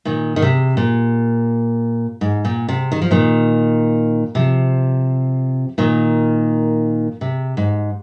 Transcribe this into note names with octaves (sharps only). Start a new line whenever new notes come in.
A#2 D#3
D#3
C3
A#2
G#2
A#2
C3
D#3
F3
A#2 D#3
C3 F3
A#2 D#3
C3
G#2